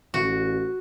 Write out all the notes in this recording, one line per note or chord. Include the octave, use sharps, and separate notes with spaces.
A1 F#4